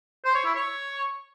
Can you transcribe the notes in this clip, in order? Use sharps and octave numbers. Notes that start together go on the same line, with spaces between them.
C5
C#5
E4
C#5